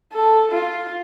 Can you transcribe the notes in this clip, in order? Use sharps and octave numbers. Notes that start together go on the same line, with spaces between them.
A4
F4